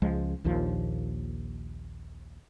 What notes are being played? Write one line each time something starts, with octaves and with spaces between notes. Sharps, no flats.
C#2 F3 G#3
A#1 D#2 A#2 F3